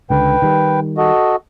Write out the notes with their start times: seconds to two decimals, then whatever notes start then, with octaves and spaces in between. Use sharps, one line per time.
0.10 C#2 D3 B4 G5
0.42 D#3 G3
0.97 F#4 A4 D#5